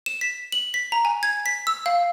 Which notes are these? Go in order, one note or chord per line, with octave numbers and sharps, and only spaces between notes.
E7
B6
F#7
B6
A#5
G#5
G#6
B6
E6
F5